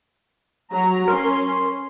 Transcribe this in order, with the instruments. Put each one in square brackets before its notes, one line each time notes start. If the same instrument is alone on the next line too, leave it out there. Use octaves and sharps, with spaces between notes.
[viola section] F#3 A#5
[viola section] C#4 [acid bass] A#4 [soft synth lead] C6